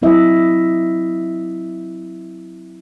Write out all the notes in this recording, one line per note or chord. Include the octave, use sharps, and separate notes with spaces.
F#3 C4 E4 D#5 E5